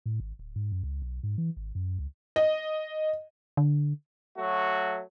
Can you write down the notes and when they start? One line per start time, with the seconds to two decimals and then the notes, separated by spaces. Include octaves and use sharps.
0.06 A2
0.20 G#1
0.39 D1
0.56 G#2
0.72 F#2
0.83 C#2
1.02 B1
1.23 G#2
1.38 E3
1.57 G#1
1.75 F#2
1.99 C#2
2.36 D#5
3.57 D3
4.38 F#3 A3 F#4